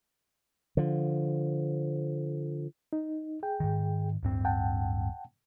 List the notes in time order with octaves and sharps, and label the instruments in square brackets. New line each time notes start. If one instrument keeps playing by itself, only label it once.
[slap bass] D3 F3
[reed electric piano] D#4
G#4 G5
[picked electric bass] G#2 D#3
D1 G2 C4
[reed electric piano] F#5 G5 A5